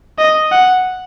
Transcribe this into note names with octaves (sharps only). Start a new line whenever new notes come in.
D#5
F#5